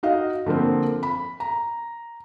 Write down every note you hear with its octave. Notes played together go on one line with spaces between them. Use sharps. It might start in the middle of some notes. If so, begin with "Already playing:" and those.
D#4 F#4 D#5 F5
D3 F3 A#3 C4
B5
A#5